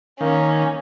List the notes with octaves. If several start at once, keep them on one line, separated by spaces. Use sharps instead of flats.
D#3 A#3 C#4